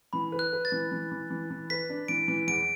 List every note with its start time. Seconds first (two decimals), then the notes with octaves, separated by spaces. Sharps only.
0.13 E3 B5
0.32 B4
0.39 F#6
0.53 B4
0.65 A6
0.72 E3
0.92 E3
1.11 E3
1.30 E3
1.50 E3
1.70 B4 B6
1.90 D4
2.08 E3 D7
2.28 E3
2.48 E2 D7